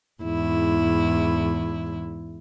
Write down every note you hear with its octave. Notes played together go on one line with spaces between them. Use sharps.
E2 G#2 E4